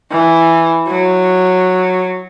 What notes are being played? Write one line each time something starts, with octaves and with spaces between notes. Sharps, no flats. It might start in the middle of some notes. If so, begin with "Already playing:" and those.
E3
F#3